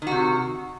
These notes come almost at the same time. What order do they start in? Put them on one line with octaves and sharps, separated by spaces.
D#3 F#4 C3